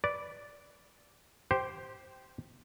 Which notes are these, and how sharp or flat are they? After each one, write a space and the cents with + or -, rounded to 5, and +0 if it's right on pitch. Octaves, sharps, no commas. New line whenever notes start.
B4 +0 D5 -10
G4 -10 C5 +0